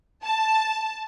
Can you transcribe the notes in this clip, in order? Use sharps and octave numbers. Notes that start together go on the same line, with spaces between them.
A5